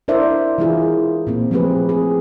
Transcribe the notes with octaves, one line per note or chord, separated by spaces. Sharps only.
D4 E4 A#4 C5 D5 E5
E3 G#3 E4 F4 G#4 A#4
A#2 A#3 C4
F3 A3 C4 G4 G#4 B4
G#4